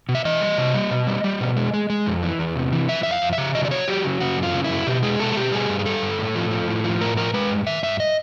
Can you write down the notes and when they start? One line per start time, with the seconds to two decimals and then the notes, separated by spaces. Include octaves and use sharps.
0.09 B2
0.15 E5
0.25 E3 D#5
0.41 G3
0.58 C3
0.74 G3
0.91 B2
1.07 G3
1.24 G3
1.41 B2
1.57 G#3
1.74 G#3
1.90 G#3
2.06 F2
2.23 E3
2.39 E2
2.56 C3
2.72 E3
2.88 F3 E5
3.03 F2 E5
3.11 F5
3.22 F2
3.33 E5
3.38 C#3
3.55 F#3 D#5
3.65 D5
3.71 F#3 C#5
3.88 F#3 G4
4.04 C#3
4.20 C#3 F#4
4.37 F#2
4.43 F4
4.54 C#3
4.64 E4
4.70 F#2
4.86 B2 G4
5.03 G#3 G#4
5.19 B2 A4
5.30 G#4
5.36 B2 G4
5.52 G3 G#4
5.70 G2
5.79 G#4
5.86 G3 A4
6.02 G2
6.19 A2
6.35 F3
6.51 F3
6.68 A2
6.84 F3
7.01 A2 A#4
7.17 F3 A#4
7.34 G#3 B4
7.51 G2
7.67 D#3 E5
7.83 G2 E5
8.00 D#5